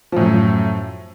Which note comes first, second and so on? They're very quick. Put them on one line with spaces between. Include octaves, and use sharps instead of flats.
F3 A2 F#2